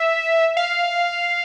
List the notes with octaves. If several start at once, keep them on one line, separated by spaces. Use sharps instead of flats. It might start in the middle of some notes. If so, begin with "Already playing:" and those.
Already playing: E5
F5